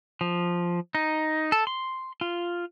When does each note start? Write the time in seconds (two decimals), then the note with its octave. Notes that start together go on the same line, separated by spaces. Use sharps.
0.21 F3
0.95 D#4
1.52 A4
1.67 C6
2.21 F4